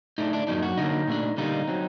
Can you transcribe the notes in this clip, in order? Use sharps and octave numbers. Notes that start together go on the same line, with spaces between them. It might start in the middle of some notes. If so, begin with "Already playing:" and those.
A2 A3 D4 D#4
D4
F#2 F#3 A#3 D4 D#4
F#4
D3 F#3 A#3 D#4
A#2 A3 D4
D3 G3 A#3 D#4
F#3 C4